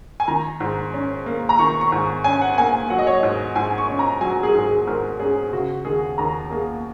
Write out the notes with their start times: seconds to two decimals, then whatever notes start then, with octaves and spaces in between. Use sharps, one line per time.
0.20 G#5
0.28 D#3 A#5
0.60 G#2
0.94 C#4
1.26 A#3
1.49 A#5
1.59 D#3 C#6
1.81 C#6
1.92 G#2
2.24 C#4 G#5
2.41 F#5
2.58 A#3 G#5
2.90 F#3 F#5
2.99 D#5
3.07 C#5
3.14 D#5
3.23 G#2
3.55 G#2 G#5
3.78 C#6
3.89 C#4
3.99 A#5
4.21 F#3 G#5
4.43 G#4
4.55 G#2
4.65 G#4
4.87 G#2 A#4
5.19 C#4 G#4
5.53 C#3 F#4
5.85 D#2 G#4
6.18 D#2 A#5
6.50 A#3 G#4